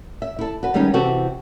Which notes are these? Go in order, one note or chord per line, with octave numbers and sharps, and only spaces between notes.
E5
E4 A4
F#4 B4
D#3 G3 G#3 B3 C#4 D#4
C3 E3 C4 F#4 G4 A4